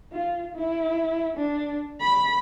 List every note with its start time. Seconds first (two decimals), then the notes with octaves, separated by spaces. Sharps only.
0.13 F4
0.56 E4
1.37 D4
2.00 B5